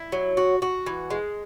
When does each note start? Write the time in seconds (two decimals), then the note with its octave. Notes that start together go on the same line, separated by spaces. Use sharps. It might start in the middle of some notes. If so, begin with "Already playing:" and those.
Already playing: E4
0.12 F#3
0.37 F#4
0.62 F#4
0.86 E3
1.10 G#3